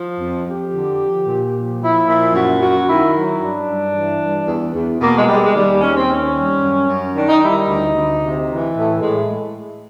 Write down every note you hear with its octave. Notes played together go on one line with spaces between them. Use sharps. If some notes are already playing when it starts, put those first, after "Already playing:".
Already playing: F3
F2
F2 G4
D3
F3
A#2
F3
F3 E4
A#2 E4
F#2 F#4
F#2 F#4
D#3 E4
F#3
G2 D4
G2
E3
G3
E2
E2
B2 A#3
G#3
G3 G#3
G#3
D#2 G3
D#2 C#4
C4
D#3 C#4
G3
F#2
F#2
D#3 D4
D#4
G3 E4
D#4
D2
D2
C3
E3
A2 A3
A2 G#3